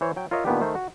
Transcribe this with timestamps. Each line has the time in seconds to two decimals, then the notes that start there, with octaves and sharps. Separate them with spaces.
0.01 E3 C5 C#5
0.16 F#3 G5
0.31 F4 A#4 C#5 D#5 E5
0.45 A#2 D#3 B3 D4 G4
0.61 D#3 A3 C5
0.75 F#4